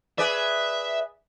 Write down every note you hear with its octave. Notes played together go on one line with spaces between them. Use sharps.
G#4 B4 D5 E5